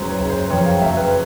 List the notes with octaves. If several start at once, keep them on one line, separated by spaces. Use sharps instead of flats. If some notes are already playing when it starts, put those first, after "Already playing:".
Already playing: F#1 C#3 F#3 B4 C5
C#5
F#1
C5
F2 C#5
F5
F#3 E5
B4